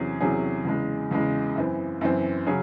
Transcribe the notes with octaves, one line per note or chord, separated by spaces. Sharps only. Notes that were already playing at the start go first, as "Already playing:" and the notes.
Already playing: E2 C3 F#3 C#4 G#4
E2 C3 F#3 C#4 G#4
E2 C#3 G#3
E2 C#3 G#3
F#2 E3 C4
F#2 E3 C4
C#3 F#3 C#4 G#4